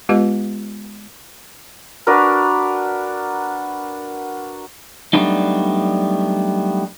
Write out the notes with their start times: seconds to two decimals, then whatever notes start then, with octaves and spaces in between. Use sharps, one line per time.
0.09 G#3 B3 F4 G4 B4 D#5
2.07 D4 F#4 A#4 B4
5.13 F#3 G3 A3 B3 D4 D#4